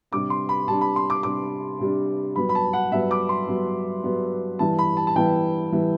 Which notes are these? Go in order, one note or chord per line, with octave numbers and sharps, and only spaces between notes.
C3 G3 D4 D6
C6
B5
C3 G3 D4 A5
B5
C6
D6
C3 G3 D4 D6
C3 G3 D4
G2 F#3 B3 B5
B5
A5
F#5
G2 F#3 B3 E5
D6
C6
G2 F#3 B3
G2 F#3 B3
G2 E3 G3 B3 E4 A5
B5
A5
A5
G2 E3 G3 B3 E4 G5
E3 G3 B3 E4